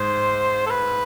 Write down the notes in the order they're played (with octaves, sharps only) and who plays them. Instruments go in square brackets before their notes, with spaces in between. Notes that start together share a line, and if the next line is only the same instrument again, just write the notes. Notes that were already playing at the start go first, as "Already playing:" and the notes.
Already playing: [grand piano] G#2 [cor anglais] C5
[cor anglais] A4
B4